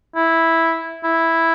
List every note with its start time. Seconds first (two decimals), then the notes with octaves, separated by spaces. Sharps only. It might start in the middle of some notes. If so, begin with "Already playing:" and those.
0.16 E4
1.04 E4